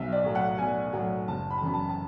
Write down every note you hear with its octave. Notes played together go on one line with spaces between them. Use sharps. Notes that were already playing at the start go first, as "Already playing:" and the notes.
Already playing: B1 E5
D5
A2 F#3
F#5
B1 G#5
A2 F#3
F#1 A5
B5
A5
F#2 E3 B5
A5
A5